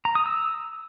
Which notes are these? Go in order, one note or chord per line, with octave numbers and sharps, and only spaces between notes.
A#5
D#6
E6